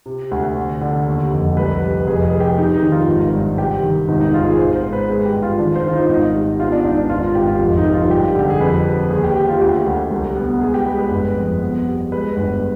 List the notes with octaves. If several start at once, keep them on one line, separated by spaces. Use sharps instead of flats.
C3
D2
D3
D3
D#2
F1
C2 B4
C3
F1 G#4
G#4
G3
G4
C3 D#4
D#4
D#3
F4
G#1
G2
C3 G4
D#3
G#1 D#4
D#4
G#1 F4
G#4
G#1 C5
C5
G#2
B4
G#3 G#4
G4
G2
F4
D#3 D4
C5
D#3 F4
D#4
G#1 D#4
G3
B3 F4
D4
G#1 D#4
D4
G#1 F4
F4
G#1 G4
F4
F1
D#4
G3
F4
G2 G4
D3 G4
G#4
F2 B4
G3
D#2 G#4
G4
G3 G4
F4
D2 G4
D2
C2
B3
G#3 G#4
G4
G#3 B4
B4
G1
F2
B3
G3
G#3 B4
G1